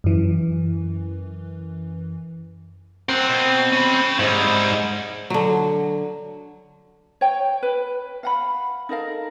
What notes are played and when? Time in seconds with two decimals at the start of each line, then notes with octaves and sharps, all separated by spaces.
0.04 F#2 E3
3.09 C4 A#4 F#5
3.29 B2
3.73 C#4 B5
4.19 G#2 G3 E4
5.30 D3 F#3
7.21 C#5 G5
7.63 B4
8.23 F5 F#5 B5
8.89 D#4 A4 A#4 F5